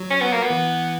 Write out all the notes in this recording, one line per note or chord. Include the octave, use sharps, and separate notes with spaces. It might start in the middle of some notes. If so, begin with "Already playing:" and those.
Already playing: F#3
C#4
B3
A#3
B3
E3